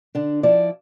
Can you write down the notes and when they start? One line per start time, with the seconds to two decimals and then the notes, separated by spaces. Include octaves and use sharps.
0.15 D3 D4
0.43 F3 E4 D5